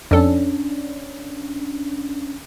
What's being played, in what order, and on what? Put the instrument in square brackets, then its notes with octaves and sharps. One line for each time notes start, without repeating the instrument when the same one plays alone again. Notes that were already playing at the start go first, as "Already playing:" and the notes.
[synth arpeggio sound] F2 A4 [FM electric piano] C#4 D4